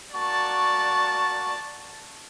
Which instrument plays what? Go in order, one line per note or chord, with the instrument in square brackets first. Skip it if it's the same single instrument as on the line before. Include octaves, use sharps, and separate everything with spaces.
[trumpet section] A#3 F#4 C#6 [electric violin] D5 A5